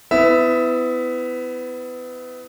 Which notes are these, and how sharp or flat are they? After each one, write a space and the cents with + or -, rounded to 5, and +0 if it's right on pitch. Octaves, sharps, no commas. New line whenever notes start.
B3 +30 E4 +0 E5 +0